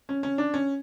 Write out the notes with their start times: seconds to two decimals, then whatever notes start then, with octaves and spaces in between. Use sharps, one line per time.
0.09 C#4
0.23 C#4
0.38 D4
0.54 C#4